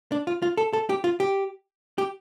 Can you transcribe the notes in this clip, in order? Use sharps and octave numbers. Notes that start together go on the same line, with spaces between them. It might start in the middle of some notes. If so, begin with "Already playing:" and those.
D4
F4
F4
A4
A4
G4
F4
G4
G4